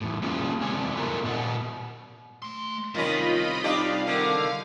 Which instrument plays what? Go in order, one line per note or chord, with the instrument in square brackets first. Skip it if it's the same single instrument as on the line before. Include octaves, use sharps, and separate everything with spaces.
[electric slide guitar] E2 A2
A#3 C#4 F4 G#4
E2 C3 G#3 C#5 D5 G#5
A3 B3 F4 G#4 A#4
A#2 B3 D5 D#5 F#5
[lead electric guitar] A3 C6
[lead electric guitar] C3 G3 [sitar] D#3 C#4 [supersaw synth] F4 D#5 B5
[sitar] D4 D#4 G4 [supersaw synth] F5
[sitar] D3 D#3